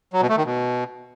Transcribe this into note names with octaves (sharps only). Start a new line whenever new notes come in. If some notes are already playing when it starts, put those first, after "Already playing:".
F#3
B2
A3
D#3
B2